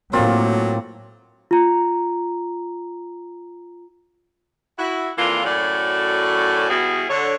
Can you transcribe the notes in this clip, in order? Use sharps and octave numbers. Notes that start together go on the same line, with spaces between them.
A2 F#3 A#3 C4 F4
F4 A#5
E4 F#4
F2 E3 A#3 D4 F4
F#2 A2 F#3 C#4 A4 D5
B2 G3 B3 E4 F#4 G#4
D3 C#5